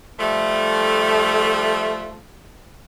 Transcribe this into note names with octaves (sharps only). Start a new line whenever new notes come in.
F3 G3 A3